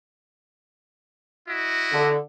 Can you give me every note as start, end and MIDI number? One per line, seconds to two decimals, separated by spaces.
1.48 2.14 64
1.48 2.14 66
1.48 2.14 75
1.93 2.16 50